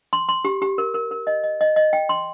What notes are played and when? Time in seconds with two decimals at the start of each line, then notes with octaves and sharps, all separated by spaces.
0.13 C6
0.29 C6
0.45 G4
0.62 G4
0.78 A#4
0.94 A#4
1.11 A#4
1.27 D#5
1.44 D#5
1.61 D#5
1.76 D#5
1.93 G5
2.09 C6